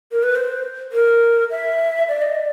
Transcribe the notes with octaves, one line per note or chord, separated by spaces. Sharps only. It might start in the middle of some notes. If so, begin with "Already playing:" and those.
A#4
B4
C5
A#4
E5
D5
D#5
D5